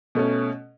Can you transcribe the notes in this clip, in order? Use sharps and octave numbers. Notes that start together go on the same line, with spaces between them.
B2 A3 C#4